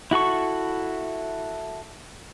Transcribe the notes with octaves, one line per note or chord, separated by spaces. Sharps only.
E4 F#4 A4 C#6